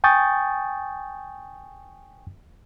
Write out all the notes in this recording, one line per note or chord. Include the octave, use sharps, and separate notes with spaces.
G5 G#5 C#6 D#6 G6 A6